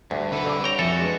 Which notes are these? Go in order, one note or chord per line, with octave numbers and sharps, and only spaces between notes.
D2 G2
B1 D3 A4 B4 E5
C2 D6
C#5 G5 A#5
F2 F3 F#4 A4 E5 G#5
G#3 D4 B4